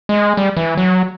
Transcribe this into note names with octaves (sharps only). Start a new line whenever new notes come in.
G#3
G3
E3
F#3